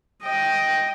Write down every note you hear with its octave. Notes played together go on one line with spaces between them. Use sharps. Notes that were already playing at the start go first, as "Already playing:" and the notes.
D#5 G5